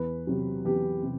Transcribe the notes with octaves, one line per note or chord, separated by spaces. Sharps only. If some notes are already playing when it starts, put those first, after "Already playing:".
Already playing: E2 B4
C3 F#3
E2 G4
C3